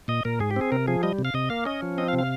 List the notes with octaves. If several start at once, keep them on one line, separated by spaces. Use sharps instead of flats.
A#2 D#5
A#2 A#4
G#2 G#4
G4
C4 G#4
C3 A#4
F3 G#4
G3 D#5
C3
F5
C3 D#5
A#3 F5
C#4 D#5
F3
C4 D#5
F5
C3
F5